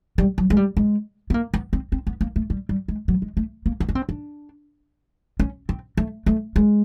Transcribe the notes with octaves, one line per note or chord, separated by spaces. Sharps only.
G3
F#3
G#3
G3
G#3
B3
A#3
B3
C4
C4
B3
A#3
A3
G3
G3
G#3
F#3
G#3
A3
A#3
B3
C#4
C4
D4
C#4
C4
A3
A3
G#3